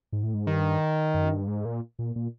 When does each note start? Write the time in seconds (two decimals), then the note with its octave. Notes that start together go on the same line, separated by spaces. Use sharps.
0.13 G#2
0.23 A2
0.34 G#2
0.46 G2 D#3
1.14 F#2
1.31 G2
1.47 G#2
1.65 A#2
1.99 A#2
2.16 A#2